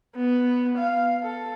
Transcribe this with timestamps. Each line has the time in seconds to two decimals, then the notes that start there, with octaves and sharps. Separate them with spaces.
0.16 B3
0.78 F5
1.23 A4